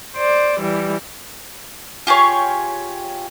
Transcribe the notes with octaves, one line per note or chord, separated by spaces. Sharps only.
C5 D5
E3 G3
F4 G4 G#4 C#5